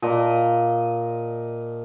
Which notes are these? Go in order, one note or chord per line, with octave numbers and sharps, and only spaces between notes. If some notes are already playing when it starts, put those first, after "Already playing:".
A#2 D#5 A5 A#5